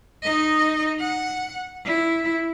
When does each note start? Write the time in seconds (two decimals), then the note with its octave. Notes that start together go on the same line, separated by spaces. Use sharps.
0.22 D#4 D#5
0.99 F#5
1.85 E4